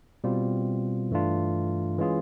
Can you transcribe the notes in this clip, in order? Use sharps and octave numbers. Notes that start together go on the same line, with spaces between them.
B2 G3 C4 F4
G2 E3 A3 D4 F4
E3 G#3 C#4 F4 G#4